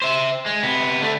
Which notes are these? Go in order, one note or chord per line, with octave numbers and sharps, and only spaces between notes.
C5 E5
G#3
C3 B3
D3 A3